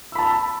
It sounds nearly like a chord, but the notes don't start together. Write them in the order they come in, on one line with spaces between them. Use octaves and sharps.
E6 B5 A5